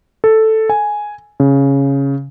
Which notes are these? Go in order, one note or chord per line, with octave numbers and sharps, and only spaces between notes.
A4
G#5
C#3